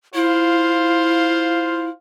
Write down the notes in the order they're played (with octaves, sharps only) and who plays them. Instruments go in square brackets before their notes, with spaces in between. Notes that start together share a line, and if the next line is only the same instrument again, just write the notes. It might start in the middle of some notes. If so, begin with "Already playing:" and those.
[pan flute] E4 [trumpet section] F4 C5 F5